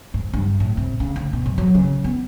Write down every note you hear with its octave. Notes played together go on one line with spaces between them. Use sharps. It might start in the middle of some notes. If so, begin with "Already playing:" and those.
G#2
G2
A2
C3
C#3
D2
B2
F#2
F#3
C#3
B3